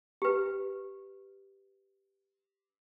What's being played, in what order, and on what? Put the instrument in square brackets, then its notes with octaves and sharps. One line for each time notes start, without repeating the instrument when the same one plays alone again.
[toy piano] G4 B4